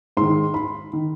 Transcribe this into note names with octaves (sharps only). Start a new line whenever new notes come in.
G#2 D#3 C6
B5
D#3